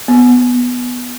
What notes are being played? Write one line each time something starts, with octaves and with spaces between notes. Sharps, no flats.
B3